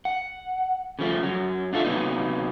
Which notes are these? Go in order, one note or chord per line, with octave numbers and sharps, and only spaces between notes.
F#5
C#3 F3 A3
F#2 F#3
D4 F4 A4 D5 E5
C3 F#3 A#3 B3 D#4